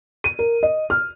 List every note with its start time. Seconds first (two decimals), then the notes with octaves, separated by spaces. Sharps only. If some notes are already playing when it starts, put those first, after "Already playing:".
0.24 D#7
0.39 A#4
0.63 D#5
0.90 F6